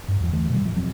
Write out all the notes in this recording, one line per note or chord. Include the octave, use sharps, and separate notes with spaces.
G2
E2 F3
D#2 D3 E3 A3
B2 D#3 F3 G3
A2 F3
E1 F3 F#3 C4